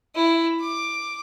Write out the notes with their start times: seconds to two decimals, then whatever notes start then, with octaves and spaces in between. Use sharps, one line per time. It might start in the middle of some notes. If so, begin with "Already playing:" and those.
0.14 E4
0.60 D6